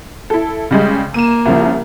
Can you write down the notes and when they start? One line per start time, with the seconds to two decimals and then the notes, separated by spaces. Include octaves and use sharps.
0.30 E4 A4
0.71 C#3 G3 G#3
1.14 A#3 D#7 E7
1.46 C2 C#3 F3